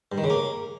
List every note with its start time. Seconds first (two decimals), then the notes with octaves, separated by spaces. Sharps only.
0.12 G2
0.18 D#3
0.24 C#3
0.30 A#3